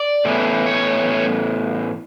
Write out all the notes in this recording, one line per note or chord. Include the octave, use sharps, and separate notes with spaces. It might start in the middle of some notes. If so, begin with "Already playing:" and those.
Already playing: D5
A2 E3 B3
C#5